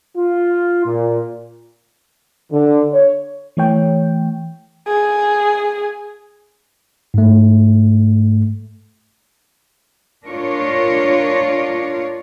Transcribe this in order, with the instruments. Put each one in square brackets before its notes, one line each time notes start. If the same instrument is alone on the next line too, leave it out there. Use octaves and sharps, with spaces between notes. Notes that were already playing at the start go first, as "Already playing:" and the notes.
[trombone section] F4
A#2
[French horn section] D3
C#5
[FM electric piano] E3 A3 C#5 G5
[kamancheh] G#4
[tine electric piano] G#2 A3
[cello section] D4 F4 A#4 C#5